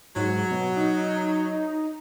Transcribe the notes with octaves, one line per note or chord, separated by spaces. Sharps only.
G#2 F#3
B2
D#4